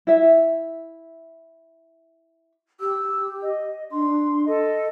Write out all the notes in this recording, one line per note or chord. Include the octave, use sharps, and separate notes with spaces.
E4 E5
G4 E6
D#5
D4 C6
A4 D#5